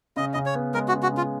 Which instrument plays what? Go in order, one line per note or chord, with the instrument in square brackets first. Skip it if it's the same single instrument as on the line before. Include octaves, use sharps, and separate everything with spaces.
[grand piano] C#3 [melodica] D#5
[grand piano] C#3 [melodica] D#5
[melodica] C#5
[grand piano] B3
[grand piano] G#3 [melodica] A#4
[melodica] F#4
[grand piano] C#3
[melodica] F#4
[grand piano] C#3 [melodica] F4